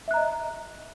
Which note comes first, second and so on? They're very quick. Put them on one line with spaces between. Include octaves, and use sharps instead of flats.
E5 F#6 A#5 D#5